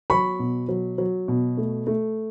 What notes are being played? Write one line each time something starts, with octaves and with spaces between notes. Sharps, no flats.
F#3 B5 C#6
B2
F#3
F#3
B2
A3
A3